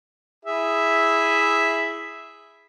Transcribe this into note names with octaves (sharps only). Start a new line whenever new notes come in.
E4 G#4 E5